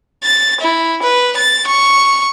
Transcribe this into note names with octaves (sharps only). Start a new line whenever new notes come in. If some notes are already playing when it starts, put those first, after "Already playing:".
A6
E4
B4
A6
C#6